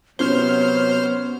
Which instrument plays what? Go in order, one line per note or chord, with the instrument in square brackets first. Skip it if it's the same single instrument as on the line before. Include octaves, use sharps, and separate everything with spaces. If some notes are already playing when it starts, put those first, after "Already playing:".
[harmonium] C3 F#3 [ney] B3 [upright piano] C#4 G7 [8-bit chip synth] C5 F6